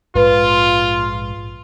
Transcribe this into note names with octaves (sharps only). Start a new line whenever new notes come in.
A#1 G#2 G#3 F4 B4